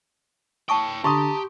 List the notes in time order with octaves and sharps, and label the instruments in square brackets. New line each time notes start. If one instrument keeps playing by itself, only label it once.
[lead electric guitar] C#5 G5 [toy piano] A5 C#6 D#6
[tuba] D3 [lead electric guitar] G4 [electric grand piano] A5 A#5 D#6 [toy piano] C6 C#6